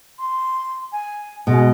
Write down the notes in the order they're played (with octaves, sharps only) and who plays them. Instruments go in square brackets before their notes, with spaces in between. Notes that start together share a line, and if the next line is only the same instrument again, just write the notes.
[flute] C6
G#5
[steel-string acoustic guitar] B2 [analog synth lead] G#3 [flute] D#5